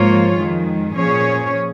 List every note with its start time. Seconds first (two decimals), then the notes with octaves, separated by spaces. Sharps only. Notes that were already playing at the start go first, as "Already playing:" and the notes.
Already playing: G#2 F3 A#3 F4 C#5
0.35 F2 D#3 G#3
0.95 A#2 F3 C#4 G#4 C#5